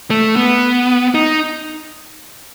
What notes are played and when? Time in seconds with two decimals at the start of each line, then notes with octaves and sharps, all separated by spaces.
0.10 A3
0.36 B3
1.14 D#4